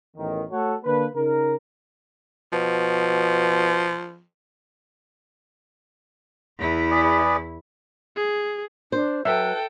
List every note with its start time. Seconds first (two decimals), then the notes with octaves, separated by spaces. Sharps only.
0.17 A1 E2 D#3
0.51 A3 F#4 A4 C#5 F#5
0.84 D3 A#3 D4 B4
1.14 C#3 D#4 A#4
2.53 B2 F3
6.59 E2 E4
6.91 G#4 B4 D5
8.17 G#4
8.92 D4 C5
9.25 F#3 A4 B4 E5 G5